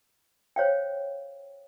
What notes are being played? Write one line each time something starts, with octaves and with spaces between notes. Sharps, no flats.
C5 C#5 F5 G5